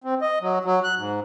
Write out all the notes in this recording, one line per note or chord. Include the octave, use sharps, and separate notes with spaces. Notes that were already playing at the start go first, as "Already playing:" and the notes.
C4
D#5
F#3
F#3
F#6
G#2